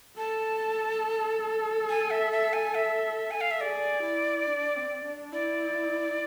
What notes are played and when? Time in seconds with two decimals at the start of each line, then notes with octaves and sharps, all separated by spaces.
0.17 A4 A5
1.89 G#5
2.10 E5
2.32 E5
2.53 G#5
2.75 E5
3.31 G#5
3.41 F5
3.51 E5
3.61 G#4 D5
4.03 E4
4.47 D4
4.75 C4
5.05 D4
5.33 E4 D5